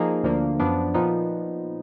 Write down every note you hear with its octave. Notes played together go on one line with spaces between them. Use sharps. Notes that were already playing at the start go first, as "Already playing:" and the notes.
Already playing: F3 A#3 D#4 G#4
D2 D3 F3 A#3
F#2 F3 B3 D4
A#2 F3 B3 D#4